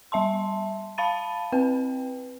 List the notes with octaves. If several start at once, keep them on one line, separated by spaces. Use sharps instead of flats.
G3 E5 A5 C6
F5 A5 B5 A6 D#7
C4 B4 G5